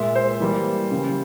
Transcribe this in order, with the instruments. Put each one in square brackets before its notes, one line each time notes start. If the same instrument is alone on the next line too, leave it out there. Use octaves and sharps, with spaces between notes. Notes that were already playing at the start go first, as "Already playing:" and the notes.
Already playing: [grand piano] A#2 G#3 E5
C5
E3 G3 A#3
C#3 E3 G3